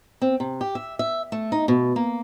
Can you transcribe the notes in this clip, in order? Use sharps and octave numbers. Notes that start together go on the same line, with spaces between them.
C4
C3
G4
E5
E5
A3
D#4
B2
A#3